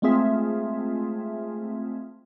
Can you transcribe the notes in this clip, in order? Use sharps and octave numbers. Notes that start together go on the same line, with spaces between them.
G#3 A3 C4 F4 G#4 E5